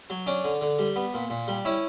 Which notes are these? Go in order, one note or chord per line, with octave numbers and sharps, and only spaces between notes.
F#3
C#4 D4 D5
D3
D3
G3
B3
A#2
A#2
G3
C#4 E4 E5